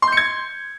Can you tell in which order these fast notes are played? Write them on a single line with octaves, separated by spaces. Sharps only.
C6 G6 C#7 G#6